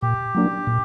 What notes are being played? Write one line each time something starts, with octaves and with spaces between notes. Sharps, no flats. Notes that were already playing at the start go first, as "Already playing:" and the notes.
A#2 G4
F#3 A#3 D4
A#2